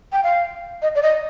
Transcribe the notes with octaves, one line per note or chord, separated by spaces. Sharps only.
G5
F5
D#5
D5
D#5